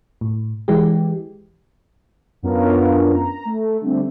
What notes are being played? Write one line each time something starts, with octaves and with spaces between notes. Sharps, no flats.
A2
E3 G#3 G4
F#2 B3 C#4 D4 F4 A#4
A#5
A3
D3 G3 A3 C4